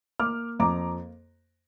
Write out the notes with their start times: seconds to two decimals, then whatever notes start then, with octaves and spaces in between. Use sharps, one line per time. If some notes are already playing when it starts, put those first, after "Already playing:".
0.20 A#3 D6 F6
0.60 F2 A#5 D6